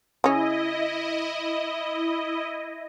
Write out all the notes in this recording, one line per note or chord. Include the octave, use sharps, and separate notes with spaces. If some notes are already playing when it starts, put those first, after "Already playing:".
C#3 C#4 E4 D#5